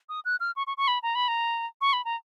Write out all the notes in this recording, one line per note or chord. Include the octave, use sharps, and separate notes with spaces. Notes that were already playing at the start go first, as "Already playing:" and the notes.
D#6
F#6
F6
C#6
C#6
C#6
B5
A#5
B5
A#5
C#6
B5
A#5